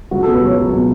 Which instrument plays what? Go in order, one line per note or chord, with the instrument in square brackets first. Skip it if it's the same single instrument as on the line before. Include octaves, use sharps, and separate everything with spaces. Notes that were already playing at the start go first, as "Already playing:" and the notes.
[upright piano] C#2 F#4
B2 A4
B4
C#2 C#5
F#3
B2